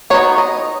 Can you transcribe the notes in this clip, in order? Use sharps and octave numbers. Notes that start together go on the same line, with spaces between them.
F#3 B3 D#4 C#5
D#5